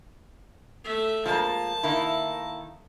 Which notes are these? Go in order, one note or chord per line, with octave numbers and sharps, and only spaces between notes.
A3 E5
F3 G#3 A#3 A5
D#3 A#3 E4